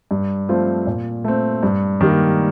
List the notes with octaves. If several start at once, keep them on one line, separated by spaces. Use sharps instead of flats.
G2
F3 A3 C4 F4
A#2
A3 C4
G2
D#3 G3 A#3